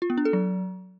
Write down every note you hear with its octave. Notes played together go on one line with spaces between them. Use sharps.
F4
B3
D4
A4
F#3